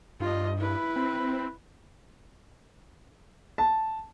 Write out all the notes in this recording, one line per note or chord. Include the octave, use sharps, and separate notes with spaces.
G2 F4 D#5
E4 B4
C4
A5